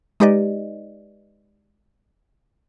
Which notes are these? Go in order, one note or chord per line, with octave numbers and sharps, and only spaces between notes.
G#3 D#4 G4 B4 D5 D#5